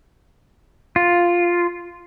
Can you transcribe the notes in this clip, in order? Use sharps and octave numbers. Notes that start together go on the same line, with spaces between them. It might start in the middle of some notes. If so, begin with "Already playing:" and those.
F4